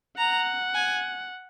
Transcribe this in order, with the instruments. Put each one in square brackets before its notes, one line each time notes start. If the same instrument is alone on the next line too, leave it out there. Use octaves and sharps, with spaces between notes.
[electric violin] F#5 [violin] A#5
[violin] G#5